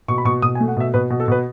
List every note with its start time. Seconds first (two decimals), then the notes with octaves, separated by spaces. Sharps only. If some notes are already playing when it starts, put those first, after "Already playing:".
0.08 B2 C#6
0.18 B5
0.25 B2 C#6
0.42 B2 D#6
0.55 G#5
0.60 A3
0.68 F#5
0.77 B2 E5
0.94 B2 B4
1.10 B2
1.20 A4
1.28 B2 B4